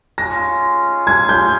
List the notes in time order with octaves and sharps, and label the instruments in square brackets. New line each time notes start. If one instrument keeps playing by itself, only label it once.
[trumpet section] G#3 C#4 F4 [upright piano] A#6
[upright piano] G#6
G6